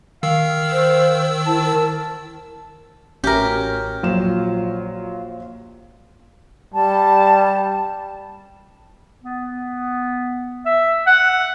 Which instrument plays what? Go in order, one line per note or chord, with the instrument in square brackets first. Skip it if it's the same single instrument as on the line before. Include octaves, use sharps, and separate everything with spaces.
[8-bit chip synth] D#3 E6 [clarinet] F5
[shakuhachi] C5
[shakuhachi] E4 [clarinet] A5
[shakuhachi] A#4
[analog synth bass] A1 [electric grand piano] C#4 F#4 [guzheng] G4 A#4 [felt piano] E5
[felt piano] A#1 E7 [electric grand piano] F#3 [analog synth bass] F4
[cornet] G3 [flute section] A5
[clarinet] B3
E5
F#5